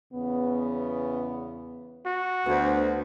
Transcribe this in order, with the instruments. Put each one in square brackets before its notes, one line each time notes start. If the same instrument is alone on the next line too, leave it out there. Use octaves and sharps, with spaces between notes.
[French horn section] E2 C#3 B3
[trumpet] F#4
[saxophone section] D2 [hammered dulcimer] B3 C5